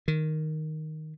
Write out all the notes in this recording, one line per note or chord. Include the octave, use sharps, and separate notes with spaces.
D#3